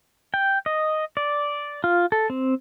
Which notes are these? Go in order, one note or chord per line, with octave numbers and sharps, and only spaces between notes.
G5
D#5
D5
F4
A4
C4